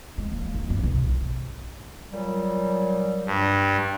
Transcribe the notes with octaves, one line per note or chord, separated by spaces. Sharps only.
G#3
A#3
D#4
G2
B1
A#2 F#3 G3
G2